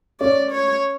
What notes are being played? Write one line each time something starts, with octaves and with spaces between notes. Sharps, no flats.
C#4 D5
C#5